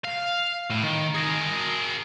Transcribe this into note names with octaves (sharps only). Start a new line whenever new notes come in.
F5
A2
D#3
G#4 A#4